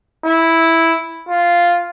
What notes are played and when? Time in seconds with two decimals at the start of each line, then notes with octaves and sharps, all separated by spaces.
0.25 E4
1.29 F4